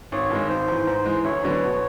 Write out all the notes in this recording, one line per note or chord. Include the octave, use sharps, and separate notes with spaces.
G#1 C#5
G2 D#3 G#3
G#1 C5
G#2 E3
G#2
E3 G#3
D2 C#5
D3 F#3 B3 D4
B2